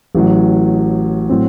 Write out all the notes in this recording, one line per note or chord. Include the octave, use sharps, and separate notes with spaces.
A1 A2 F#3
A2 F#3 C4